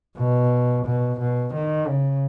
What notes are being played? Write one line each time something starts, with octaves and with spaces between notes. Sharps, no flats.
B2
B2
B2
D#3
C#3